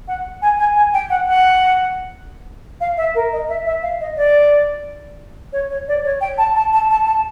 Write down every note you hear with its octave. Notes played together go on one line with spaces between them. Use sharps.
F#5
G#5
G#5
G#5
G5
F#5
F#5
F5
E5
A#4
D#5
E5
E5
F5
D#5
D5
C#5
C#5
D5
C#5
G5
A5
A5
A5
A5
A5